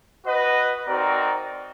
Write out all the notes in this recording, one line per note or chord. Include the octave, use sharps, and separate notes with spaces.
F#4 B4 D#5 F#5
C4 D#4 F#4 A#4 D5